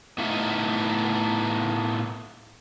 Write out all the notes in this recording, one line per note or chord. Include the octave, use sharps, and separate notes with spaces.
A2 A3 B3 D#4 F4 E5